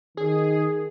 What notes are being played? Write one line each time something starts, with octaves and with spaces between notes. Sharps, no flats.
D#3 G#4